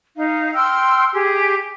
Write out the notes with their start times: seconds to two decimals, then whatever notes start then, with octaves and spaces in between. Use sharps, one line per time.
0.18 D#4 F5
0.54 G5 C6 E6 F6
1.13 G4 G#4